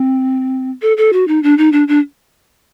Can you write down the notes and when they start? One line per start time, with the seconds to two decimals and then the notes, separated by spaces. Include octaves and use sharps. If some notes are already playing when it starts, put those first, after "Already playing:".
Already playing: C4
0.82 A4
0.97 A4
1.13 F#4
1.28 D#4
1.43 D4
1.58 D#4
1.72 D4
1.88 D4